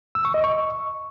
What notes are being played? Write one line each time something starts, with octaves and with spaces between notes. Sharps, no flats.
E6
C#6
D#5
C#6